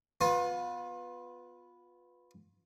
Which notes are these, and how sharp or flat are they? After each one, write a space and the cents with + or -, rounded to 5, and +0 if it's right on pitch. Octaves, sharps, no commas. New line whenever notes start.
B3 +0 F4 +30